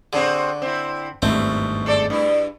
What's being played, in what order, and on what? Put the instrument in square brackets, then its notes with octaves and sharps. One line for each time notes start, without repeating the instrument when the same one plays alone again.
[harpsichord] D3 [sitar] C4 F#4 G#4
[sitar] C4 E4
[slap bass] G#1 E2 G2 [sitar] B2 [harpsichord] A3 C4
[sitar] G#3 A4 D5
G2 E4